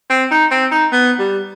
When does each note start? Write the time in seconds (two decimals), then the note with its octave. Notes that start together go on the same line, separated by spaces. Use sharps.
0.10 C4
0.31 D#4
0.51 C4
0.72 D#4
0.92 B3
1.19 G3